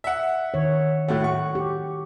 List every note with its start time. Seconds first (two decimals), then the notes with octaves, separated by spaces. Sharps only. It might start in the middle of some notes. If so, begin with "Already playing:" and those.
0.04 E5 F#5
0.54 D#3 C#5
1.08 A2 A3 F#4 F#5
1.24 C#6
1.55 G4